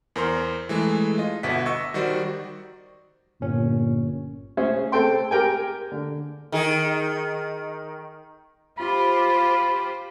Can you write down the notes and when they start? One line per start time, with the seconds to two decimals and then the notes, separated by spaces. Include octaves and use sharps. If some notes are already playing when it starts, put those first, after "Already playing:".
0.16 E2 A#4 C5 C6
0.69 E3 G#3 A3
1.18 F4 D#5
1.43 G1 B2 E5 F#5 B6
1.66 D#5 C#6 E6 C#7
1.94 D#3 G3 F#4 C5 D5
3.41 G1 A#2 C#4
4.57 C#4 G#4 C5 E5
4.92 C4 A4 G5 C6
5.31 G4 A#4 G5 G#5
5.92 D3
6.52 D#3 G#4
8.78 F4 G4 C5 B5